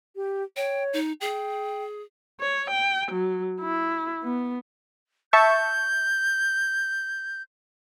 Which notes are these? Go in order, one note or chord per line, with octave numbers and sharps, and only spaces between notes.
G4
C#5 G5
D#4
G#4 G5
C#5
G5
F#3
E4
B3
E5 A5 C#6 G6